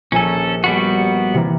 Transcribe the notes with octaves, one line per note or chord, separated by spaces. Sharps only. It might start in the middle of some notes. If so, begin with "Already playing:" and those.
A#1 C#4 A4 G#5 D#7
G3 B3 F#4
C3 E3 A#3